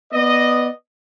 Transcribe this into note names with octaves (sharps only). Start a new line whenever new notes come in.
B3 D5 D#5